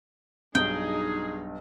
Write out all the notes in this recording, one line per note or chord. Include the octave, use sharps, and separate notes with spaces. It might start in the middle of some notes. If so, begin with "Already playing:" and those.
B1 G2 D#4 G#4 G5